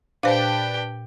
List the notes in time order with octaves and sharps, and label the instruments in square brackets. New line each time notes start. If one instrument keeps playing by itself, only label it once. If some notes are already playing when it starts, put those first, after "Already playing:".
[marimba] A#2 [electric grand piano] D4 B4 A5 [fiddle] G4 G5 [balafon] C5 F5